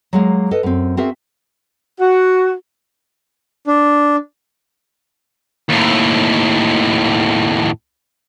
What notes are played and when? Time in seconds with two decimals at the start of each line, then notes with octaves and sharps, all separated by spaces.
0.13 F#3 G#3 A#3
0.51 A4 B4 D#5
0.63 F#2 C4
0.97 C4 F#4 G#4 A#4 E5
2.00 F#4
3.67 D4
5.69 D#2 A2